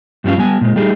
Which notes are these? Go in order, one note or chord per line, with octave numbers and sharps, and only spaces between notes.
G2 F3 G3 C#4 F5
G3 B3 G#5
A#2 G#3
G3 A3 D#4 G4 G#4